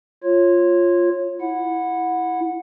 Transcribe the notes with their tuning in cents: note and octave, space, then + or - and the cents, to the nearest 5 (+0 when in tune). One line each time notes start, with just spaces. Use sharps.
F4 +0 C#5 -20
E4 +0 F#5 -15